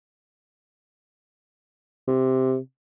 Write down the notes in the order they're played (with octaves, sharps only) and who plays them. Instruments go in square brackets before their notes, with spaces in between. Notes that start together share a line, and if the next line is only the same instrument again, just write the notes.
[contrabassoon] C3